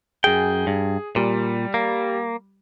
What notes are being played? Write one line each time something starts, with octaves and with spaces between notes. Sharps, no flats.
F#2 G#4 G5
G2
A#2 G3
A#3